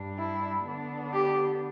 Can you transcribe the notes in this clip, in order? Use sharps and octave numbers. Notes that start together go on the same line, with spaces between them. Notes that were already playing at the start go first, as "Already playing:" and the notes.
Already playing: G2 G3 D4
E4
D3 B3 D4
G4